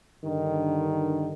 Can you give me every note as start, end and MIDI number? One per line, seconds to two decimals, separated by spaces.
0.25 1.33 43
0.25 1.33 50
0.25 1.33 51